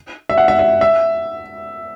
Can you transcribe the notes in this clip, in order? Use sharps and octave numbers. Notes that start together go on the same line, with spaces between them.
E5
F#5
E5
E5
E5